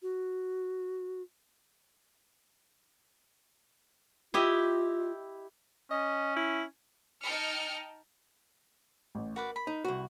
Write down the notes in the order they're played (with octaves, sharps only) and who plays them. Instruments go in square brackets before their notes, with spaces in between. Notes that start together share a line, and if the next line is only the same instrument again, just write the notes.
[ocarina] F#4
[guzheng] E4 G4 D#5 [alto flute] F4
[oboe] C#4 [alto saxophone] D#5
[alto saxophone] E4
[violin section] D#4 G5 A5 F6 C#7
[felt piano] A1
[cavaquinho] F#4 B4 D5 [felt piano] A#4
[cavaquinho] B5
[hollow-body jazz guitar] D#4
C2 F#4